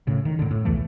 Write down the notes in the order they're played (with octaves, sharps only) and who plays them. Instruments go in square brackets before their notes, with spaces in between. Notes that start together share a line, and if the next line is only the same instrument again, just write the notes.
[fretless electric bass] A2 C#3
D#3
A2 D3
A2
B1 E2 E3 A3